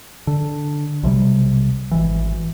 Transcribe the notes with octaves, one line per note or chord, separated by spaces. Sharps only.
D3
B1 C3 D#3 G3
G#1 E3